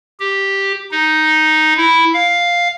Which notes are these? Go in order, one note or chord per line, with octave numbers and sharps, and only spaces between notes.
G4
D#4
E4
F5